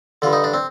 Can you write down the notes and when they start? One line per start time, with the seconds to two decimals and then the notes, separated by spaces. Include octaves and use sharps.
0.22 G2 D3 F4
0.33 D#4
0.44 D4
0.54 C4